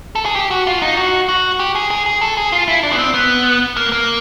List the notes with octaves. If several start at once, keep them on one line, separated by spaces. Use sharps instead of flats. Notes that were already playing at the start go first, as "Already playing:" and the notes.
A4
G#4
G4
F#4
F4
D#4
F#4
F#4
G4
G#4
G#4
G#4
A4
G#4
F4
E4
D4
B3
C4
B3
A#3
A#3